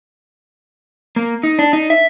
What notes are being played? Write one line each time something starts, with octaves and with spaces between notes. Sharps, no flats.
A#3
D#4
D4
D#4
E5